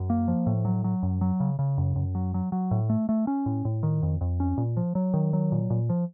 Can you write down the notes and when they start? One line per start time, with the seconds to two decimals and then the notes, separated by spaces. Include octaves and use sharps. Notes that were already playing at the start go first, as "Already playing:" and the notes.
Already playing: F#2
0.10 A#3
0.28 F3
0.46 A2
0.65 F#3
0.84 F#3
1.03 F#2
1.21 F#3
1.40 C#3
1.59 C#3
1.78 F#2
1.96 F#2
2.15 F#3
2.34 F#3
2.52 F#3
2.71 A2
2.89 A3
3.09 A3
3.27 C#4
3.46 A2
3.65 A2
3.83 D#3
4.03 F2
4.21 F2
4.40 C#4
4.57 A#2
4.77 F3
4.95 F#3
5.14 D#3
5.33 F#3
5.52 A#2
5.70 A#2
5.90 F3